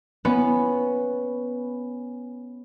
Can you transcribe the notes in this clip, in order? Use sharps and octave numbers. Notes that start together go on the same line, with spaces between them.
B3 C#4